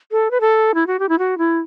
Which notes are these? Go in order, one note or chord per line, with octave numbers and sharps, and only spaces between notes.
A4
B4
A4
E4
F#4
G4
E4
F#4
E4